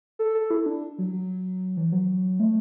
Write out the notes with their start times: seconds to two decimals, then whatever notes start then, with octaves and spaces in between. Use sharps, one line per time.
0.19 A4
0.35 A4
0.51 E4
0.66 D4
0.98 F#3
1.13 F#3
1.77 E3
1.92 F#3
2.40 A3